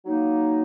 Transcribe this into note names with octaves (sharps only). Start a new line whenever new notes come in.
F#3 A#3 D#4